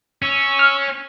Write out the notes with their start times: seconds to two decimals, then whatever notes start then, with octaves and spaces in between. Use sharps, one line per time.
0.22 C#4 C#6 E6
0.59 F6